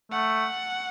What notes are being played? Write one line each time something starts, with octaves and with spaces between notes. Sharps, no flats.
A3 F#5